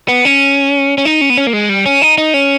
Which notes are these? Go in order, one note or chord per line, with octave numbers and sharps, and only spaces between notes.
B3
C#4
C#4
D#4
C#4
B3
C#4
A#3
G#3
G3
C#4
D#4
D#4
C#4